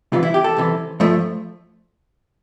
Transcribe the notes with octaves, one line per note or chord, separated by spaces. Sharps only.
C2 C3 E3 F4
E4
G4
A4
C2 C3 E3
G2 F3 A3